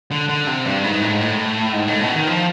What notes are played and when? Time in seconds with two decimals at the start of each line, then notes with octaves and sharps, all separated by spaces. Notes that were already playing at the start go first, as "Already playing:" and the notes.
0.11 D3
0.29 D3
0.47 C3
0.65 G2
0.84 G#2
1.02 A2
1.11 G#2
1.21 A2
1.73 G#2
1.88 A2
2.00 B2
2.15 D#3
2.27 F3